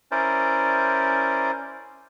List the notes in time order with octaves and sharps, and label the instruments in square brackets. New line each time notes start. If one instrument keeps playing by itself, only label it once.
[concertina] C#4 E4 A#4 C5 D5